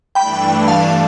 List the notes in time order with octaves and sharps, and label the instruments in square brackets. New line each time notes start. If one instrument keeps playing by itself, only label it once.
[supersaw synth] G2 E3 A3 D4 [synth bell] G5 B5
[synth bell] F5 A5